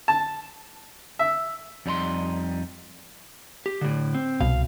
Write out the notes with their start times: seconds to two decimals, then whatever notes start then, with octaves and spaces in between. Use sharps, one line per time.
0.08 A5
1.19 E5
1.86 F2 G3 D#4 A#5 C6
3.66 G4
3.81 A2 D3
4.14 C4
4.41 C2 B2 F5